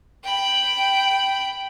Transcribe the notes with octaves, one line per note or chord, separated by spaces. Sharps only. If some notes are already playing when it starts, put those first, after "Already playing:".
G5 B5